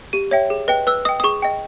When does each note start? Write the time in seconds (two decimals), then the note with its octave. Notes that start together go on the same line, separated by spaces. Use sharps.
0.13 G4 D#7
0.31 C#5 E5 G5
0.50 G#4
0.68 B4 D#5 G5
0.87 B4 E6
1.05 D#5 G5 D#6
1.20 D#6
1.24 G#4 C#6
1.42 D#5 G5